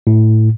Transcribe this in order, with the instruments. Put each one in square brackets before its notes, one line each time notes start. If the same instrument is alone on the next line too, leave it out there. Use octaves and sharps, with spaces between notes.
[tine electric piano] A2